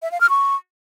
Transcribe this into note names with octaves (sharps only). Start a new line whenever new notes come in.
E5
F5
F6
C#6